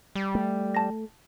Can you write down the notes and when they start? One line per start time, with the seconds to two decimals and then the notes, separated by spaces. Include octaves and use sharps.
0.16 G3
0.35 A3
0.75 A5 A#6